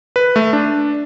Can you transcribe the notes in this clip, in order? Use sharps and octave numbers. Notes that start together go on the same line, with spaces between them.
B4
A3
D4